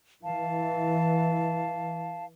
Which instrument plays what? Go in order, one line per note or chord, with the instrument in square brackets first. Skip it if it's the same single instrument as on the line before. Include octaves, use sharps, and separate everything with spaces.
[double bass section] E3 [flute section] F5 A5